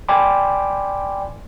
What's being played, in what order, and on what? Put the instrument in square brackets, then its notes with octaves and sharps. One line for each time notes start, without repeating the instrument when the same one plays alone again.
[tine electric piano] D5 G5 G#5 B5 C6 D6